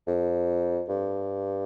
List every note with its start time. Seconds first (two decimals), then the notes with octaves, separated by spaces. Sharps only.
0.07 F2
0.89 G2